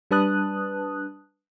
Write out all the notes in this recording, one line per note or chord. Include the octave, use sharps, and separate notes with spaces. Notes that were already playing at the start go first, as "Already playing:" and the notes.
G3 D4 B4 A5 D#6 F#6